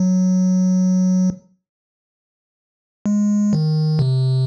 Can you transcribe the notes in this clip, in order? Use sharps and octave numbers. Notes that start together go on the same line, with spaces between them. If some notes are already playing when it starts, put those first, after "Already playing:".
Already playing: F#3
G#3
D#3
C3